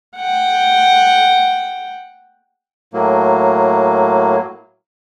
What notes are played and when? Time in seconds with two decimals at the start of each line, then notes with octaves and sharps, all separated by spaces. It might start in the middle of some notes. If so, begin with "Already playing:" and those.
0.17 F#5 G5
2.93 A2 F#3 A#3